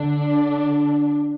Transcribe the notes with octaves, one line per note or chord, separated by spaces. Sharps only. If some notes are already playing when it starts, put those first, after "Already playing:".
Already playing: D3 D4